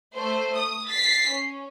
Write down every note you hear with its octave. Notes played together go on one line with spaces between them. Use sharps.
A3 C5
D#6
A6 B6 C7
C#4